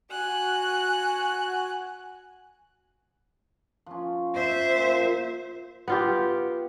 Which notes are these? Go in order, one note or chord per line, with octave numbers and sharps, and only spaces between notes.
F#4 G#5 F#6
F3 C#4
C5 E5
A#2
B3 F4 G4